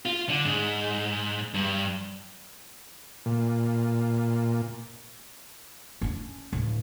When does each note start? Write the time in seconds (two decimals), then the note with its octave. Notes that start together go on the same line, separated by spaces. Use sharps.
0.05 F4
0.29 D3
0.45 G#2
1.54 G2
3.26 A#2
6.01 C#4 D4
6.53 D1